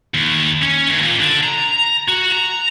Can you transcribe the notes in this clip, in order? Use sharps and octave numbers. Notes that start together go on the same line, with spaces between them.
D#2
C#4
D#2
A#2
D3
A#5
F#4
A#5